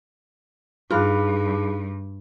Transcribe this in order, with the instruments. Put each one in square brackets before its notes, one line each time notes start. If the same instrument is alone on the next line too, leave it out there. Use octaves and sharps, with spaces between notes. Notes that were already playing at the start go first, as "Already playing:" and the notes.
[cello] G2 [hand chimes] D#4 G#4 B5 [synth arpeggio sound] F4 [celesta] F5 F#6